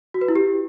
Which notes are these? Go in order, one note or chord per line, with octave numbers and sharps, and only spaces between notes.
F#4
B4
E4
G4